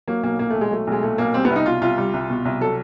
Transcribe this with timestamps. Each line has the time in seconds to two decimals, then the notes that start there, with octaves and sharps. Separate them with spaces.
0.08 F#3 A#3
0.23 B1 A#3
0.39 A#2 A#3
0.50 B1 A3
0.61 G#3
0.71 F#3 A3
0.87 B1 G#3
1.03 A#2 A3
1.18 B1 A#3
1.34 G3 C4
1.45 B3
1.50 C2
1.56 D#4
1.66 B2 F4
1.82 C2 F4
1.98 G3
2.13 C2
2.30 B2
2.45 C2
2.61 F#3 A4